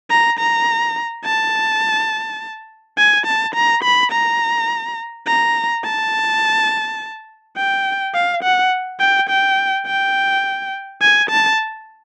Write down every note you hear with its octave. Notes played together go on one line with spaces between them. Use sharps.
A#5
A#5
A5
G#5
A5
A#5
B5
A#5
A#5
A5
G5
F5
F#5
G5
G5
G5
G#5
A5